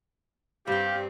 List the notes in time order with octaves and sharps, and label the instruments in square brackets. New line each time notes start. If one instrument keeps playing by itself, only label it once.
[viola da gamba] G2 C4 [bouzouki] G3 G5 [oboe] G4 [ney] F5